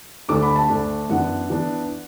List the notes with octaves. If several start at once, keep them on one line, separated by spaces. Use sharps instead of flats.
D2 D3 A3 D4 D6
B5
A5
D2 D3 A3 D4
F#2 E3 B3 D4 F#5
E3 B3 D4